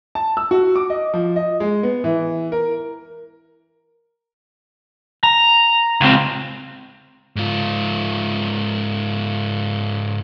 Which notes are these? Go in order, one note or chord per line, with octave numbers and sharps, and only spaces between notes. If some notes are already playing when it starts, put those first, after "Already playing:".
A5
E6
F#4
D6
D#5
F3
D#5
G#3
B3
E3
A#4
A#5
C#2 C4
G#2 F4